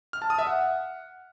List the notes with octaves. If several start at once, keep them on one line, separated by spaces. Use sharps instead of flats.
F6
A5
D#6
E5
F#5